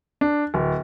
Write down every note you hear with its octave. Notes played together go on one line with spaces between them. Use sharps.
D4
D1